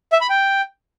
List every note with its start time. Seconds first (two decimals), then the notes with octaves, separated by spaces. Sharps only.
0.12 E5
0.21 B5
0.30 G5